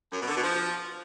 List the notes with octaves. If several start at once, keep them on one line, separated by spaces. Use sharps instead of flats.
F#2
B2
D3
B2
F3